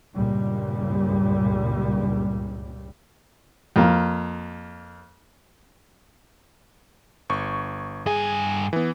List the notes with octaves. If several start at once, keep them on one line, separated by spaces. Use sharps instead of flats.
C#2 G2 A#2 G3
F2 A#3
G1 C#6
G2 G#4 G#5
E3 B3